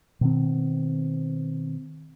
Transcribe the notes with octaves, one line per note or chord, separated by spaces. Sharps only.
B2 D#3 C4